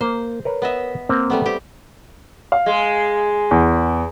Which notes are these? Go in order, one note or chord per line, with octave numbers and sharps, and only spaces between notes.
A#3 C5
A#4 B4 C#5
B3 D#5 E5
A#3 C4 A#4
G3 A3 B3
C4 G4
F5
G#3
E2